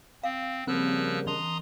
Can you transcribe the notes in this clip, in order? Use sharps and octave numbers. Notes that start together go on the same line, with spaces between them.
C4 F5
C#3 F3 G3 A#3 C4 E6 F#6
E3 A#5 C6 D#6